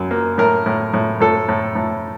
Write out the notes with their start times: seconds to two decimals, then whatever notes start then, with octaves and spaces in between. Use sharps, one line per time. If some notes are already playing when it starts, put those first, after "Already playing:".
Already playing: F#2 A#3
0.11 A#3
0.38 A2 A#4
0.66 A2
0.94 A2
1.20 A2 A4
1.49 A2
1.75 A2